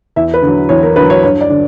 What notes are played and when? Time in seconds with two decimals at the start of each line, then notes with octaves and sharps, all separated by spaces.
0.16 E2 E5
0.34 B4
0.42 D3
0.48 F#3
0.69 E2 C#5
0.83 A#4
0.96 D3 F#3 B4
1.10 C#5
1.23 G2 C#5
1.41 D5
1.50 D3